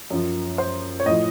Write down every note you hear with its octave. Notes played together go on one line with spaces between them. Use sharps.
F#2 F3
C5
C#5
A2 F3 D#5